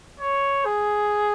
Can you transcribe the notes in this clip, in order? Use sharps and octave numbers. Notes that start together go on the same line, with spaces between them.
C#5
G#4